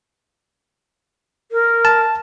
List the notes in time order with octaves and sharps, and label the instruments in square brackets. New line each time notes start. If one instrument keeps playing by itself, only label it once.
[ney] A#4
[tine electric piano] A5